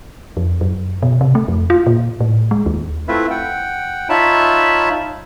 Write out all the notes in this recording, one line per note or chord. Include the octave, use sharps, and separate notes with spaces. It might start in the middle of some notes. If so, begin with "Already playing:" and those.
F2
F#2
B2
C3
A3
F2
F4
A#2
A2
G#3
D#2
A3 C4 E4 F4 B4 E5
F#5 G5
D#4 F4 C#5 E5 A5 B5